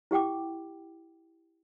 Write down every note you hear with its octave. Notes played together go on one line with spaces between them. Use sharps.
E4 G4 F#5 G5 D6